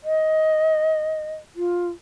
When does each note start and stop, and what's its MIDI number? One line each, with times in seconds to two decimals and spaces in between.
0.04 1.34 75
1.56 1.89 65